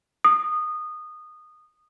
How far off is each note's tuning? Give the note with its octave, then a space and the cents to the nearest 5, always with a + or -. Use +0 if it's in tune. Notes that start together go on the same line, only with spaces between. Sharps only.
D#6 -20